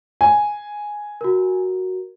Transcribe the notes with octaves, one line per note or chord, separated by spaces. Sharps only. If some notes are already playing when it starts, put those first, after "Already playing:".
G#5
F#4 A#4